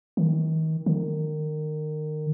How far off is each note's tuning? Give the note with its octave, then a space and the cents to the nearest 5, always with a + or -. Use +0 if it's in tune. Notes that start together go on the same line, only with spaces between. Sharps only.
D#3 +35
D#3 -25